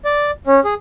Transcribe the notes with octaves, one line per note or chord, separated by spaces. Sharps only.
D5
C#4
G#4